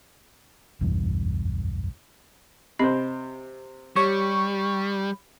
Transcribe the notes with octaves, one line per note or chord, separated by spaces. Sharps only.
F#1 B1 E2 G2
C3 C5 D#5 B5 C7
G3 G4 C#5 C#6